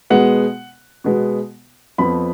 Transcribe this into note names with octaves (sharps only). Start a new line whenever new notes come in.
B2 G#3 B3 F#5
B2 G#3 B3
F2 F3 B3 B5